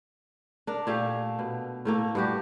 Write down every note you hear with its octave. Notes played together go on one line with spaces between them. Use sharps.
D4 A#4
A#2 A3 G4 F5
B2
A2 A3 A#3
G2 F#4 G4